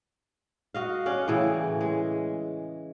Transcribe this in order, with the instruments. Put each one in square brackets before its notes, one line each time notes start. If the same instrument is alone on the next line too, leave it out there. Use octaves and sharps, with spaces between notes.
[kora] F#4 D#5 F5
C#4 D5 F5 F#5
A2 C#3 E3
G#3